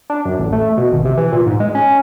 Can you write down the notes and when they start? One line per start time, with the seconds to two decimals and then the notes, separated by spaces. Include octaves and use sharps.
0.10 D4
0.25 F#2
0.39 A1
0.53 A3
0.78 B2
0.92 G#1
1.05 C3
1.17 E3
1.32 A#2
1.46 G#2
1.60 G#3
1.75 C#4